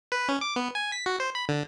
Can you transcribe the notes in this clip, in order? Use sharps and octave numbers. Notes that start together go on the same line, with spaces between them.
B4
C#4
D6
B3
G#5
B6
F#4
C5
B5
D3